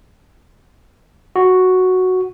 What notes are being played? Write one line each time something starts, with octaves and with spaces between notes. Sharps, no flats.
F#4